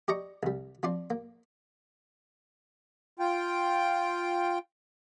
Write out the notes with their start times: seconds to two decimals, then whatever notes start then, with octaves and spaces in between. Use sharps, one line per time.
0.08 G4 D5 D#5 A#5 C#6
0.43 C2 G3
0.83 F3 C4 D5 C6
1.10 A#3
3.19 F4 G5